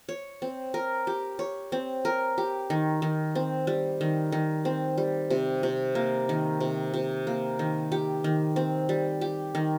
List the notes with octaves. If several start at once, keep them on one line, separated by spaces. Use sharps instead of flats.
C#5
C4
A#4
G4
C#5
C4
A#4
G4
D#3
D#3
C4
G3
D#3
D#3
C4
G3
C3
C3
A#3
D#3
C3
C3
A#3
D#3
G4
D#3
C4
G3
G4
D#3